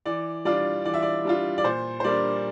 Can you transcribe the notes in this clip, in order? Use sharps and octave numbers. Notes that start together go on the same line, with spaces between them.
E3 D5
G3 D4 F4 D5
E3 D5
E5
D5
G3 D4 F4
D5
A#2 C5
C5
G3 A#3 D4 D5